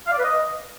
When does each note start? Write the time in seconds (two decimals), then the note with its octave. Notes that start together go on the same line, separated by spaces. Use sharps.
0.07 F5
0.13 D5
0.18 B4
0.24 D#5